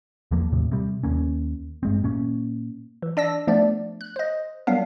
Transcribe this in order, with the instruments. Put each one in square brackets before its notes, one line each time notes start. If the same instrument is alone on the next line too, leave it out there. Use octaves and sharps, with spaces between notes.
[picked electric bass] E2 F3 A#3
D#2 A2 C3
C3 G3
D#2 A#3 C#4
G2 G#3 C4
A#2 A#3 C#4
[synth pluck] E3
D4 D5 E6 A#6
F3 A3 B3 D4 D5
F#6
C5 D#5
F#3 G3 B3 D4 A#4 F5